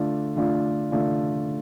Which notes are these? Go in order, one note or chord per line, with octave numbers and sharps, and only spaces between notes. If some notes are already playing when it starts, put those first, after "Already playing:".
Already playing: D3 A3 F4 D5
D3 A3 F4 D5
D3 A3 F4 D5